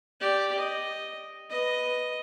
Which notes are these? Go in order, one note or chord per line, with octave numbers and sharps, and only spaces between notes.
G4 D5
D#5
B4 D#5